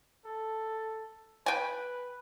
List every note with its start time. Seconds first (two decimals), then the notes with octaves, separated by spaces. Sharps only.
0.25 A4
1.46 B4 G5 G#5